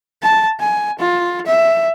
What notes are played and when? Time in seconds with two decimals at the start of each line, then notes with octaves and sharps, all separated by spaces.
0.22 A5
0.60 G#5
0.99 F4
1.46 E5